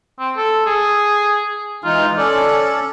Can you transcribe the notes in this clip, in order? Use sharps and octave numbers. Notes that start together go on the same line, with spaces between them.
C4
A4
G#4
E3 G#3 D#4 F4
C#4 A4 D5